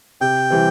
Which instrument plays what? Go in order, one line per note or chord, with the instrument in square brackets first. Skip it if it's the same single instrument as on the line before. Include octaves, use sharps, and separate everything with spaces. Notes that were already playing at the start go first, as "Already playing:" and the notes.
[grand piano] C3 [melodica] G5
[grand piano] E3 G3 C4